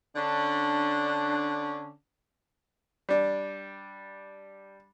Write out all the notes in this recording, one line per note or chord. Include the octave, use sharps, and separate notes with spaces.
D3 C#4 D4
G3 D4